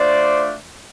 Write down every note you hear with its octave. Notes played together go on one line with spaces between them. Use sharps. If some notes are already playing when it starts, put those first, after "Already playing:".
Already playing: A3 D4 F4 C5 D5